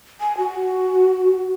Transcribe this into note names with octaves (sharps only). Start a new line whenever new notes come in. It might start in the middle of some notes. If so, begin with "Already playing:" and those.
G#5
F#4